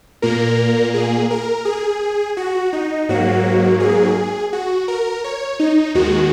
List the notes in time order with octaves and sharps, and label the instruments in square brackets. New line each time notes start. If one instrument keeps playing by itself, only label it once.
[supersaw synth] A#2 A#3 A#4
G#4
A#4
G#4
F#4
D#4
G#2 F#3 A#3 F#4
G#4
F#4
A#4
C#5
D#4
D#2 D#3 G#3 F#4